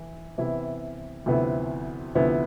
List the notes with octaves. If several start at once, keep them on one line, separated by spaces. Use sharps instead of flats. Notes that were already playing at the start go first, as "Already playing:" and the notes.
Already playing: E3 E4
C3 E3 B3 E4
D2 C3 F3 B3 E4
D2 C3 F3 B3 E4